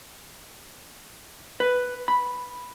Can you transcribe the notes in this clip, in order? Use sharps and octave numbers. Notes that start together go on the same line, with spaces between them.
B4
B5